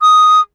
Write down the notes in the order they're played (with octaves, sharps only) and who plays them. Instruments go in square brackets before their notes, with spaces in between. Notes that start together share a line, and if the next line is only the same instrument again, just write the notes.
[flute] D#6